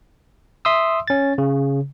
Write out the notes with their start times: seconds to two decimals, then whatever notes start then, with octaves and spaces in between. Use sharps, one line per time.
0.65 E5 C6 D#6 E6
1.08 C#4 A6
1.38 C#3